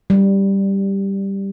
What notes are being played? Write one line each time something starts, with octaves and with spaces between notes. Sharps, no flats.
G3